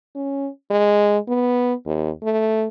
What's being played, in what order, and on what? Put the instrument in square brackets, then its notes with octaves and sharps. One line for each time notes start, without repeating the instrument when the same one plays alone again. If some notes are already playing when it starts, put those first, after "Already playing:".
[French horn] C#4
G#3
B3
D#2
A3